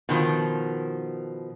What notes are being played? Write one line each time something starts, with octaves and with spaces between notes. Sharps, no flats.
B2 D#3 F3